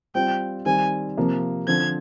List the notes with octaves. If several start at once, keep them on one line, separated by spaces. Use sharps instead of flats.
G3 C4 F4 G5
D#3 G3 C4 G#5
C3 F3 A#3
D3 F3 C4 G#6